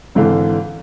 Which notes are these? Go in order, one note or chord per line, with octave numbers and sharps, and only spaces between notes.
G#1 D3 E3 A4 F5